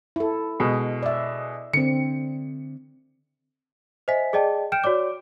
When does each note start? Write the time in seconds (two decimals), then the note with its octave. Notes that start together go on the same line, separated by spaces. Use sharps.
0.16 E4 A4
0.60 B2 G#3
1.03 D5 E5
1.73 D3 C4 C#7
4.08 C5 D#5 E5 G#5 B6
4.33 G#4 D5 D#5 G5 A5
4.72 G5 F6 G6 D7 E7
4.84 F#4 C#5 D5 D6